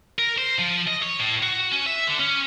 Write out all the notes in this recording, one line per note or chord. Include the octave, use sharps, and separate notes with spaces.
A#4
C5
F3
D#5
C#5
A2
F#4
C#4
E5
D3
C#4